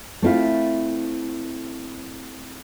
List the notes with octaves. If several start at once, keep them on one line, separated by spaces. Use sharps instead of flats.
A3 C4 E4 F4